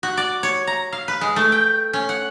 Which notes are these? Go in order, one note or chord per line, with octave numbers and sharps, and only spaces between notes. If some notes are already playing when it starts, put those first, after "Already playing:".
F#4
D5
C#5
A#5
F5
B4
G#3
A3
G5
C#4
F#5